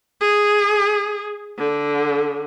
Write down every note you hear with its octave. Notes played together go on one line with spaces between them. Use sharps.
G#4
D3